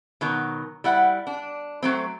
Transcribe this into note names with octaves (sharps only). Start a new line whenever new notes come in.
B2 D#3 F#3
G3 E4 F#5
D4
F#3 A3 C4